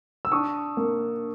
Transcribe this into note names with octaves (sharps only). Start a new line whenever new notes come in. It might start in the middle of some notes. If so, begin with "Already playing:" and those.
E6
D4 C#6 D#6
A#3